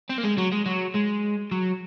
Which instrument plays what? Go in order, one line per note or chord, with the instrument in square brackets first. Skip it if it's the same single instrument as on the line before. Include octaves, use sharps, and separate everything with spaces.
[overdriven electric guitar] C4
A#3
G#3
F#3
G#3
F#3
G#3
F#3